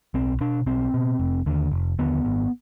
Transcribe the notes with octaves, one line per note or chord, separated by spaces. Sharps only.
B1 C4
B2 D4
B1 C4
B2
F1
D#2 D3
F1
D#2 D3 B3
G#1